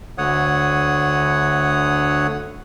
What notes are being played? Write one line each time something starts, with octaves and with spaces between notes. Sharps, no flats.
D2 D3 C#5 F#5 D#6